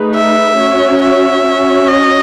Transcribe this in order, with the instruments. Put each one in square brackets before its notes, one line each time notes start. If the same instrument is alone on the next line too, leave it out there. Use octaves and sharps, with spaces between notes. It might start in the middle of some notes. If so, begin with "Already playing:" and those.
Already playing: [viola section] A3 D#4 G#4 B4
[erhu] E5
[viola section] C#4 F#4 C#5
[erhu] E5
[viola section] C#4 F#4 C#5
[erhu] D#5